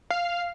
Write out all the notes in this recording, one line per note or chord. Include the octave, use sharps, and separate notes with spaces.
F5